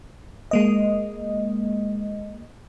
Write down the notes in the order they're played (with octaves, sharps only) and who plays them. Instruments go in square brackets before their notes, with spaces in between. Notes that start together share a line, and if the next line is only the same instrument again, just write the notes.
[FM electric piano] G#3 A#3 D#5